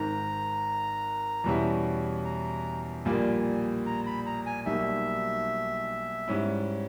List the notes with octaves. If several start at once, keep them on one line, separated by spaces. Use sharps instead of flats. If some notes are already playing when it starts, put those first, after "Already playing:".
Already playing: G#1 G#2 D#3 A#5
E2 B2 G3 C#4 E4
A#5
A#1 A#2 G3 A#3 G#5
A#5
B5
A#5
G#5
B1 B2 G3 A#3 D#4 E5
G#2 G3 C#4 E4